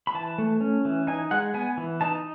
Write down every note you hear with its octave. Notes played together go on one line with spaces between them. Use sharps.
B5
E3 A5
A3
C#4
E3
D#4 G#5
G#3 F#5
B3 G#5
E3
D#4 A5